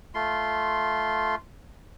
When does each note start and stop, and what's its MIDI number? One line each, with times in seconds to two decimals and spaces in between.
0.15 1.35 57
0.15 1.35 65
0.15 1.35 84